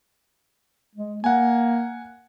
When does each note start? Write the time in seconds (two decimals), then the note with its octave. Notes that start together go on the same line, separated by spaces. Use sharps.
0.95 G#3
1.24 A#3 F#5 G#5